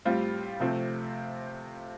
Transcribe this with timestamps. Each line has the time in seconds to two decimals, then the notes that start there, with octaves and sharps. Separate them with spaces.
0.05 A2 G3 C4 F4
0.60 C3 F3 A3 C4 F4